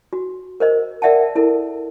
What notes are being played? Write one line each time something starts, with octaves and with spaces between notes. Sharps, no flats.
F#4
A#4 C5 D#5
A#4 D5 E5 F#5 G5 A5
E4 A4 A#4